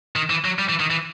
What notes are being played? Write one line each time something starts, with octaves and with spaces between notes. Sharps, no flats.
D#3
E3
F#3
G3
E3
D#3
E3